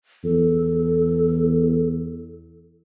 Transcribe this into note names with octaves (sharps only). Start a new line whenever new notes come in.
E2 A4